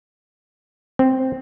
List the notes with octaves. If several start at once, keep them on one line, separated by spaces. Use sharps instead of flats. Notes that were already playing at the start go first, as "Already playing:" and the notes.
C4